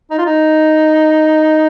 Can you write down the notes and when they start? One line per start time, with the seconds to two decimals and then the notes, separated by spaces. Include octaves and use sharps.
0.11 D#4
0.18 F4
0.26 D#4